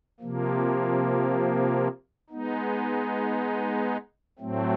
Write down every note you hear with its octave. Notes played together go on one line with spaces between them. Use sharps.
C3 F3 A#3
G#3 B3 D#4
A2 F#3 A3 C4